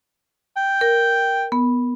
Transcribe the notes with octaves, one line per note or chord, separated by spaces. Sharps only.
G5
A#4
B3